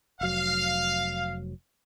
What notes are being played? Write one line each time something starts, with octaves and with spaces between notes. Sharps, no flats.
F1 F#3 F5